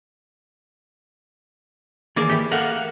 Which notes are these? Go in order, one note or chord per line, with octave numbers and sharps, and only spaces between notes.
D#3 E3 A#3 G#4 A#4 D5
E4 G4
A3 A#4 F5 F#5